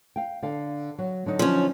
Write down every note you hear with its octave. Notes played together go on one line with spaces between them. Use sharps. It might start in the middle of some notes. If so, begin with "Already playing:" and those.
F5 G5
D3 F5
F#3
D3 F#3 D#4
F3 C#4